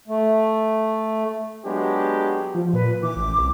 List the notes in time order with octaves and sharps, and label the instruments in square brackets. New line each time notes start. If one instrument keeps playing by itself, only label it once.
[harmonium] A3
[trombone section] F#3 G#3 B3 D4 G4
[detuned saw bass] F3
[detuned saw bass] A#2 [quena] B4
[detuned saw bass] E3 [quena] D6
[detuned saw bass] A1
C2